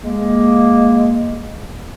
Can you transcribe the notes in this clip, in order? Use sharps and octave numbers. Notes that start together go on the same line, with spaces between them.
G#3 A#3